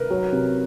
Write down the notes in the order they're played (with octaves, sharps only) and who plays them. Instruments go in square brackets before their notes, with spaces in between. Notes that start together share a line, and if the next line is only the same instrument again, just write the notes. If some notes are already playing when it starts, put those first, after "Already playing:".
Already playing: [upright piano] A#4 B4
[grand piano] F#3
C3